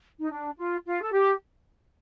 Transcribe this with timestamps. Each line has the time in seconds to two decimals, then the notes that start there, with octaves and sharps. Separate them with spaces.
0.19 D#4
0.31 D4
0.57 F4
0.86 F4
1.02 A4
1.12 G4